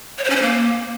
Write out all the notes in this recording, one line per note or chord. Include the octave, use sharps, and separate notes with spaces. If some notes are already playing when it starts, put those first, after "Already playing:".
C#5
C5
C#4
C5
A#3